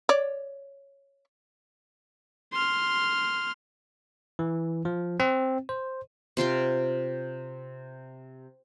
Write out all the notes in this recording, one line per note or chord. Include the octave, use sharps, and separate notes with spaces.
C#5 D5
C6 F6
E3
F3
C4
C5
C3 F4 G5 C6